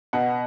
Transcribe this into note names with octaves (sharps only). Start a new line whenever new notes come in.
B2 F#5